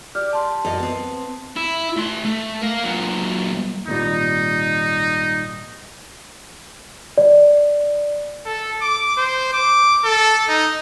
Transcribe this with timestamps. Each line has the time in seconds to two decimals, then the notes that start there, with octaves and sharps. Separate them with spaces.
0.15 G4 D5 D6 F6
0.33 A5 C6
0.65 F#2 D5 D#5
0.80 B3 C4
1.56 E4
1.97 A3 C6
2.25 A3
2.62 A#4 F5
2.83 A#2 F#3
3.87 G#1 A#2 G3 D#4
7.18 D5
8.46 A4
8.81 D6
9.18 C5
9.53 D6
10.04 A4
10.49 D#4